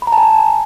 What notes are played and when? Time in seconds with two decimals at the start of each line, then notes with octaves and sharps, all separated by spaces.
0.02 B5
0.07 A#5
0.12 A5
0.18 G#5
0.23 A5